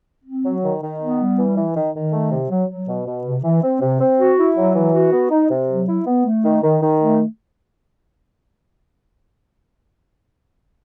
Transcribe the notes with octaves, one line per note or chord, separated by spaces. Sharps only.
C4
F#3
D#3
D#3
B3
G3
E3
E3
D#3
D#3
A3
C3
F#3
F#3
B2
B2
C3
E3
C4
C3
C4
F#4
E4
F#3
E3
F#4
B3
D#4
C3
F#3
E4
B3
A3
D#3
D#3
D#3
A3